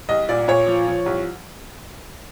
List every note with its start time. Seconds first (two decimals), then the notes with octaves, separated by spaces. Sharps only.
0.09 C2 D#5
0.29 A#2 D5
0.48 A#2 C#5
0.67 F3
0.87 F3
1.06 C2